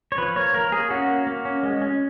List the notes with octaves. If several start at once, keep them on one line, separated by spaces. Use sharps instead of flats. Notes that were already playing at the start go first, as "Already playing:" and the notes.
C#5
F3 B4
A#3 C#5
A#3 A#4
A#3 G#4
C#4 F#4
A#3
A#3
C#4
G#3
C#4